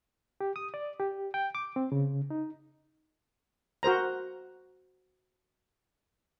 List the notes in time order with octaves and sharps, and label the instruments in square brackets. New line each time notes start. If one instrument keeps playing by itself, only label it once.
[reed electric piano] G4
D#6
D5
G4
G5
D6
C4
C#3
D#4
[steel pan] F#4 A#4 C5 A#5